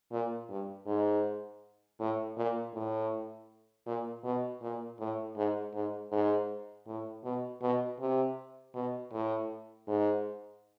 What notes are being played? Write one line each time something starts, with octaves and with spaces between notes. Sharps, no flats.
A#2
G2
G#2
A2
A#2
A2
A#2
B2
A#2
A2
G#2
G#2
G#2
A2
B2
B2
C3
B2
A2
G#2